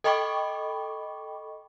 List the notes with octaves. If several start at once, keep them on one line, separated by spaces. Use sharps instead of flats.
A4 D#5 G5 B5 C#6 D6